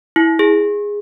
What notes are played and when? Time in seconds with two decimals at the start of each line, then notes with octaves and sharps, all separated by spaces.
0.16 E4
0.39 G#4